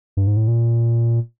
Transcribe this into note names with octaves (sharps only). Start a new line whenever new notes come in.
G2
G#2
A2
A#2